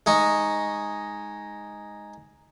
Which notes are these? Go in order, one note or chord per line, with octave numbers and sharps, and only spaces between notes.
G#3 D#4 C#6